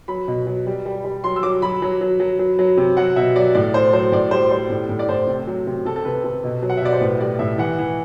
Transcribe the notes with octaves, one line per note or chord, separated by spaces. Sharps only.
F#3 B5
B2
F#3
G3
G3
G3
F#3 C6
E6
F#3 D6
F#3 B5
F#3
F#3
F#3
F#3
F#3
C3
F#3 F#5
B2 E5
F#3 D5
A2 D5
A2 C5
F#3 C5
A2 D5
G3 C5
G3 C5
A2
A2
D5
A2 C5
C3
F#3
C3
C3 A4
A4
C3 B4
C3 A4
B2
F#3
F#5
E5
B2 D5
C5
A2 B4
G3 D5
A2 E5
E3 F#5
E3